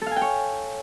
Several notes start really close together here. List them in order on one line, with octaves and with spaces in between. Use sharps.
A4 F5 G#5 G5 C#5